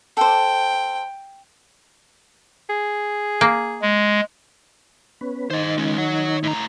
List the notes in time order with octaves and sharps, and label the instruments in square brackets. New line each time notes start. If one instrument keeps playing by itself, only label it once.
[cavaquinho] A4 C5 [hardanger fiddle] G5
[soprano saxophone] G#4
[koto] A#3
[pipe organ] G#3
[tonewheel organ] B3 C#4 B4
[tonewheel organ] D#3 D#4 [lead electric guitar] C5 D#5
[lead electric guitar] G#3 C#4
C#5 F#5
A2 A#5